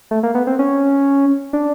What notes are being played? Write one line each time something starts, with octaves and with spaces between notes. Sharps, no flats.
A3
A#3
B3
C4
C#4
D4